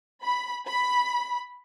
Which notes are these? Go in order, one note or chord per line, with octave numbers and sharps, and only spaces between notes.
B5
B5